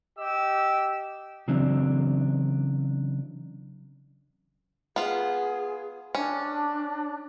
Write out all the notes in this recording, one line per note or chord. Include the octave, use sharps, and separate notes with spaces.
G4 D#5 E6
C#3 E3 F#3 C4 D4
B3 F4 G#4
C#4 D4